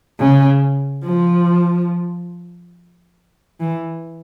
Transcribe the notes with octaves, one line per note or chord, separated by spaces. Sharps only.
C#3
F3
E3